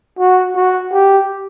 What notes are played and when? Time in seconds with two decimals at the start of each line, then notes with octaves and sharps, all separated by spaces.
0.19 F#4
0.55 F#4
0.92 G4